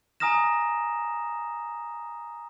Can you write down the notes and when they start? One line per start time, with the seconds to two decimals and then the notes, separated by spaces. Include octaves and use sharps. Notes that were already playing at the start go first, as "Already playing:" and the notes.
0.20 G#5 A#5 D#6 F6 A#6 E7